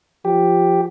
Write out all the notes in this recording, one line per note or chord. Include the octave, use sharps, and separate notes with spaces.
F3 G4